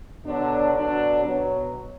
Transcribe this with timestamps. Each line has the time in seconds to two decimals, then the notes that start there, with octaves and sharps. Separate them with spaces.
0.24 B2 D3 F#3 D4
0.74 B2 D3 F#3 D4
1.22 B2 F#3